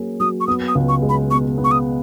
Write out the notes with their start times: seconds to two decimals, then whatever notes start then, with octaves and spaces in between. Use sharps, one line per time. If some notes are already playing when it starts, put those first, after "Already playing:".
Already playing: F#3 A#3 C#4 G#4
0.20 F#3 D#6
0.40 C#6
0.47 B3 D#6
0.68 D#6
0.75 C#2
0.89 C#6
1.02 G#3
1.09 B5
1.31 B2 C#6
1.58 B3
1.64 C#6
1.71 D#6